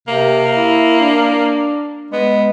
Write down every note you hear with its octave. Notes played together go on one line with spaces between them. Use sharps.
C3 A#3
E4
D4
G#3 B3